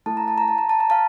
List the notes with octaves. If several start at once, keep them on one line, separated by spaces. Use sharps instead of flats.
A3 E4 A4 A5
A#5
A5
A#5
A5
A#5
A5
A#5
F5 A5